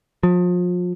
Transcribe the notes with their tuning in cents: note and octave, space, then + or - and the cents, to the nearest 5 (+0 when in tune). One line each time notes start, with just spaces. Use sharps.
F3 +35